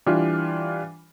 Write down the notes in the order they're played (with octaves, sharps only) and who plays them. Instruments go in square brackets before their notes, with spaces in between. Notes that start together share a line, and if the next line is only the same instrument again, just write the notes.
[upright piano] E3 G3 D4 F4